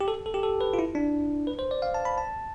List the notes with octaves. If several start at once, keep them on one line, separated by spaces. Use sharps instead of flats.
G4
A4
A4
G4
A4
B4
F4
E4
D4
B4
C5
D5
F5
A5
B5
A5